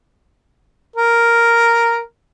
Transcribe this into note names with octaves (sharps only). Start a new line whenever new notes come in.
A#4